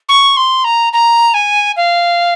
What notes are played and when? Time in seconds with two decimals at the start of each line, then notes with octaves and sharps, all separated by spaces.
0.09 C#6
0.37 C6
0.64 A#5
0.93 A#5
1.34 G#5
1.77 F5